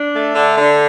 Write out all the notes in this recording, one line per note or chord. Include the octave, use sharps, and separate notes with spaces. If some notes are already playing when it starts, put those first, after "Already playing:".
Already playing: D4
A3
D3
D3